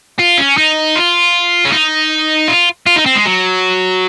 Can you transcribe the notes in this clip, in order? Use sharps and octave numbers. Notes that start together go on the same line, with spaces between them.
F4
C#4
D#4
F4
C#4
D#4
F4
F4
D#4
C4
G#3
F#3